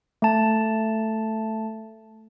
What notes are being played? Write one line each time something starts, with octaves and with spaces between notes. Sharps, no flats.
A3 A5